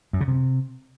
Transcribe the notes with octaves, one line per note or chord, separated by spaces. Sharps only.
F#2
C#3
C3